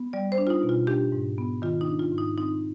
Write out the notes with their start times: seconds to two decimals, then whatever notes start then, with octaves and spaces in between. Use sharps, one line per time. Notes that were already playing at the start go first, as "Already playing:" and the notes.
Already playing: B3
0.13 G3 D5
0.32 C5
0.38 D4
0.47 F4
0.50 D#4
0.63 B2
0.69 F4
0.87 D4 G4
1.12 G#2
1.38 B3
1.62 D#3 F4
1.81 D#4
1.87 D4
1.99 F4
2.12 G#2
2.18 D#4
2.38 C4 D#4